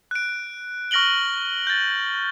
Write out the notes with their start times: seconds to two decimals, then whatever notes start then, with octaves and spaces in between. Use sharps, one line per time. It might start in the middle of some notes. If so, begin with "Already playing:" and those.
0.11 F#6 D7
0.91 C#6 F6 A#6 D7 F#7 G7
1.67 G6 A6